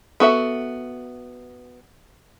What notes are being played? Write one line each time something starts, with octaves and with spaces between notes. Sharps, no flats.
B3 F#4 A4 E5